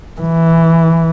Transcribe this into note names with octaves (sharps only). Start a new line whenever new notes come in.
E3